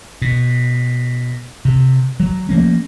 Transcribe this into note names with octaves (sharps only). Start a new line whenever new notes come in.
B2
C3
F#3
F3 A3 A#3 C#4